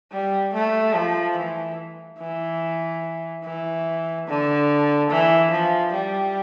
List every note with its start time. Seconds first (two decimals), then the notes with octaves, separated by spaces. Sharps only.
0.12 G3
0.53 A3
0.94 F3
1.36 E3
2.19 E3
3.44 E3
4.27 D3
5.10 E3
5.51 F3
5.93 G3